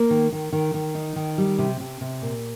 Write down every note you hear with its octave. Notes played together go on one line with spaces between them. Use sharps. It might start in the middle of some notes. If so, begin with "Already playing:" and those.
Already playing: A#3
D#3
D#3
D#3
D#3
D#4
D#3
G3
C3
C3
C3
A#2